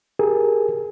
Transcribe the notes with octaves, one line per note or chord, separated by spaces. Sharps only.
G4 G#4 A#4